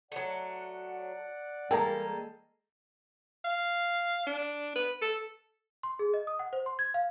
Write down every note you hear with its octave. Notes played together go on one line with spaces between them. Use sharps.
F#3 A3 D5 F#5
E3 G3 G#3 A#3 A4 A#4 G5 A#5
F5
D4
B4
A4
C6
G#4
D#5
D#6
F#5
C5
C6
G#6
F5